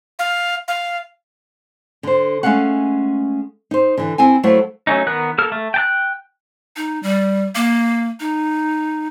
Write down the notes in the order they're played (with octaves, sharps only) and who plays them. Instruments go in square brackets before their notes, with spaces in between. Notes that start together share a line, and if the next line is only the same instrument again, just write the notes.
[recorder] F5
F5
[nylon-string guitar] D3 C5
G#3 A3 C#4 F5 F#5
D#4 C5
D3 E3
C4 E4 G#5
F#3 A3 A#3 E4 C5
[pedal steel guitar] F#3 A3 C#4 D#4
D#3 B3 A#4 F#6
A#3 A4 F6
A3
G5 A5 F#6
[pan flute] D#4
G3
A#3
D#4